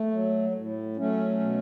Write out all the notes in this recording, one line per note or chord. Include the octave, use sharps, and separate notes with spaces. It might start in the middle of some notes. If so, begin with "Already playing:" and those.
Already playing: A3
F#3
A2
F#3 A3 C#4
B2